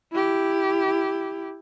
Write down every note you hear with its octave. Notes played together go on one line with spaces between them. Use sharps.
E4 G4